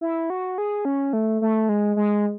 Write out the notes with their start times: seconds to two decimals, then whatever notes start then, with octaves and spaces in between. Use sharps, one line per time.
0.01 E4
0.30 F#4
0.58 G#4
0.85 C#4
1.13 A3
1.41 A3
1.69 G#3
1.96 G#3